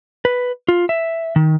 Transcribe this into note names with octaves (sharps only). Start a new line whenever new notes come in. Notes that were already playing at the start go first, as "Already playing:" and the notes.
B4
F4
E5
D#3